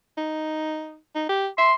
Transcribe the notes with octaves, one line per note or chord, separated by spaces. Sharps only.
D#4
D#4
G4
E5 C6